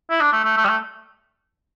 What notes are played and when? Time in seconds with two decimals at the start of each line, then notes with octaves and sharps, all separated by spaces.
0.10 E4
0.21 D4
0.33 A3
0.44 A3
0.57 A3
0.65 G3
0.69 A3